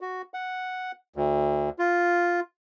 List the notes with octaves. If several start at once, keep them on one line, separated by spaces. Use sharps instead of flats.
F#4
F#5
D2
F4